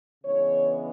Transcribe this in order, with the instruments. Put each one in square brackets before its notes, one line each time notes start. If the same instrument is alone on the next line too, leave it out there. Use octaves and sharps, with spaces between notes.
[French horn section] C#3 E3 G#3 B3 D4 C#5